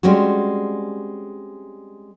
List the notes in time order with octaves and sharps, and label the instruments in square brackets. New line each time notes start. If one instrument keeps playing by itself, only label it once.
[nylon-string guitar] G3 G#3 C4 C#4 F#4